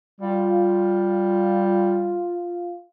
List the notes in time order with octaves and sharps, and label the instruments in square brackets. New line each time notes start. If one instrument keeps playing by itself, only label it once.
[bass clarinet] G3 [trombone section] F4